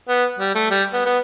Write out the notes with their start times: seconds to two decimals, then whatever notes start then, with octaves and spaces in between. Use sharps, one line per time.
0.08 B3
0.39 G3
0.55 A3
0.70 G3
0.93 B3
1.06 B3